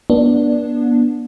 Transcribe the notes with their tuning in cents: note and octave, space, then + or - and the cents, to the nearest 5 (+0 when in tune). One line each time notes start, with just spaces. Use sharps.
B3 -35 D4 +0